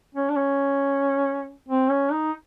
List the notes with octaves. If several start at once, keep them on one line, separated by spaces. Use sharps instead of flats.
C#4
D4
C#4
C4
C#4
D#4